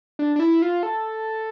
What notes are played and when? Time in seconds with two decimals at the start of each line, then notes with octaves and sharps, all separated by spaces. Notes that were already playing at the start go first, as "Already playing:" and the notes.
0.19 D4
0.36 D4
0.40 E4
0.62 F4
0.83 A4